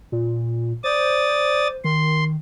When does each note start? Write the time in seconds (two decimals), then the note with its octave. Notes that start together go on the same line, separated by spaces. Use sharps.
0.12 A#2
0.84 C5 D5 D#6 A6
1.84 D#3 C6